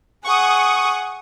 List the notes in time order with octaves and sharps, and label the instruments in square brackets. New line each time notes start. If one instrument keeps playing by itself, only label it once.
[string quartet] G#4 F#5 [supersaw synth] C#6 D#6